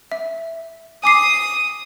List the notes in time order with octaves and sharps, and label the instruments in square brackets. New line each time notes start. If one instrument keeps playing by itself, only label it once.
[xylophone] E5
[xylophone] G#5 D6 C7 [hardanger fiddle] D#6